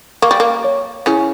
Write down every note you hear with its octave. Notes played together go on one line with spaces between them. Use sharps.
A#3 C#6
G3
A#3
C#5
C#3 C#4 E4